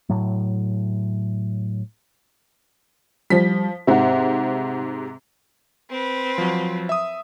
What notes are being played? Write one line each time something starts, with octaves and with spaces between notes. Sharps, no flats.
A2 F#3
F3 G3 B6
G#2 C3 E5 F#5
C4 B4
F3 F#3
E5 D#6